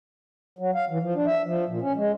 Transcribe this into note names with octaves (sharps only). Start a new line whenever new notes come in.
F#3
F5
E3
F3
D4
E5
F3
A#2
C#4
G#3